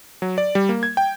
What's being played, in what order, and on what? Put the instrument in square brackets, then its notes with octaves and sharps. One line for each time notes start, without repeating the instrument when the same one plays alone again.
[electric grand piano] F#3
D5
G3
A#3
G#6
G5